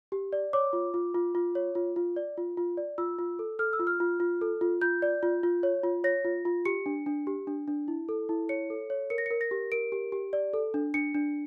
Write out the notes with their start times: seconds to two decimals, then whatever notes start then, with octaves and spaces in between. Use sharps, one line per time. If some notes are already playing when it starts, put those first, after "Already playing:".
0.12 G4
0.33 D5
0.53 C#5 D6
0.73 F4
0.94 F4
1.15 F4
1.35 F4
1.55 C#5
1.75 F4
1.96 F4
2.16 D5
2.37 F4
2.57 F4
2.77 D5
2.98 F4 E6
3.19 F4
3.39 A4
3.59 A4 F6
3.73 E6
3.80 F4
3.87 F6
4.00 F4
4.20 F4
4.41 A4
4.61 F4
4.81 F4 G6
5.02 D5
5.23 F4
5.43 F4
5.63 C#5
5.84 F4
6.04 C#5 A#6
6.25 F4
6.45 F4
6.65 G4 C#7
6.86 D4
7.06 D4
7.27 G4
7.47 D4
7.68 D4
7.88 E4
8.09 A4
8.29 E4
8.49 C#5 C#7
8.70 A4
8.90 C#5
9.10 A#4 C#7
9.18 A#6
9.26 A#4 C#7
9.41 A#6
9.51 G4
9.72 A#4 D7
9.92 G4
10.12 G4
10.33 D5
10.53 A4
10.74 D4
10.94 D4 C#7
11.15 D4